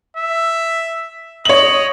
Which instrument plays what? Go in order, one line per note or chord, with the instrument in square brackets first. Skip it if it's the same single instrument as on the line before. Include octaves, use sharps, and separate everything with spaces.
[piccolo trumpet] E5
[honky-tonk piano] C#5 F#7 [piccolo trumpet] D#5